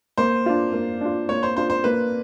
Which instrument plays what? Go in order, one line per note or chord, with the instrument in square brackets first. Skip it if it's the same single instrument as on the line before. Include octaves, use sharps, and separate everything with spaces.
[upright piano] A#3 [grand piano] C5
[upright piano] D4 F4
A#3
D4 F4
[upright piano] A#3 [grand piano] C#5
[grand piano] C5
[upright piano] D4 F4 [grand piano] C5
[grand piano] C5
[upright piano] A#3 [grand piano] B4